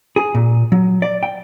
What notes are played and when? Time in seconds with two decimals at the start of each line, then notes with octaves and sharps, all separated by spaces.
0.16 G#4
0.35 A#2
0.72 F#3
1.02 D5
1.23 G5